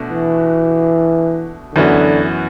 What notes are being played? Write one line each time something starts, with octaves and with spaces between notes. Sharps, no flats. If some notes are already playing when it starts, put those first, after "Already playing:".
Already playing: B2 A3 D4 F#4
E3
F#2 D3 E3 B3 F#4